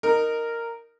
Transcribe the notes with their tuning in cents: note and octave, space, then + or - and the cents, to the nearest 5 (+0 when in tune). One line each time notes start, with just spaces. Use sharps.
D#4 -10 A#4 -10